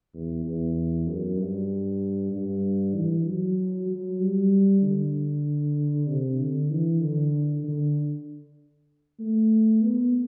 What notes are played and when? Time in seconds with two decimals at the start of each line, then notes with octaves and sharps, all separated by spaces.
0.14 E2
0.44 E2
1.07 F#2
1.38 G2
2.32 G2
2.95 E3
3.26 F#3
3.88 F#3
4.20 G3
4.82 D3
6.07 C3
6.39 D3
6.70 E3
7.01 D3
7.63 D3
9.19 A3
9.82 B3